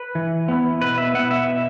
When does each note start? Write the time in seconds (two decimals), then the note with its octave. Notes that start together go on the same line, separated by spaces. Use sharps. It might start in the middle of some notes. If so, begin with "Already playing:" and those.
Already playing: B4
0.15 E3
0.48 B3 E4
0.81 B2 B4
0.98 E5
1.14 B3 E4 F#5
1.31 E5
1.48 B2